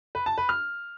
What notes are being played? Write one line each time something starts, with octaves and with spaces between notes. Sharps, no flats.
B4
A5
B4
F6